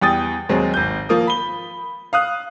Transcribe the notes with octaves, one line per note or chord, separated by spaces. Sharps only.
E2 G3 G5 D#6 A6
D#2 F#3 G#3 C4
G#1 G6
F3 A#3 D#6
B5 G7
F5 D#6 F#6